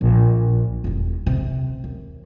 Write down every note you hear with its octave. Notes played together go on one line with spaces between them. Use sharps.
A#1
F1 E2
C3
D#2